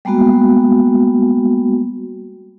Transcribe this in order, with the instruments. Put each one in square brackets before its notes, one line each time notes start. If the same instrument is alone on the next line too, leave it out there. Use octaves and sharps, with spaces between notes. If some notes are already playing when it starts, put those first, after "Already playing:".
[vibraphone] G3 G#3 A#3 B3 F#4